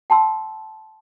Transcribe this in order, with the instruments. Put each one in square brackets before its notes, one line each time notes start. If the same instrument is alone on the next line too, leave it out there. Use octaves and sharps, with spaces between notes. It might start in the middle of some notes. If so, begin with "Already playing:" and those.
[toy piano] G5 A5 C6 E6